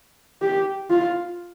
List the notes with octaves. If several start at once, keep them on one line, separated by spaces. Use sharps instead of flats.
G4
F4